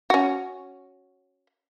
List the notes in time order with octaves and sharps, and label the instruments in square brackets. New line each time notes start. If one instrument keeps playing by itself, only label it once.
[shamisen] C#4 F#4